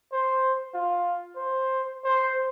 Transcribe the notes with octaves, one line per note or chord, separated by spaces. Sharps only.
C5
F4
C5
C5